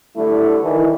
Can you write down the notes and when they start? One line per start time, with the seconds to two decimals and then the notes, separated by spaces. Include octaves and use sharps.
0.17 D3 G3 A3 E4
0.62 D#3 E3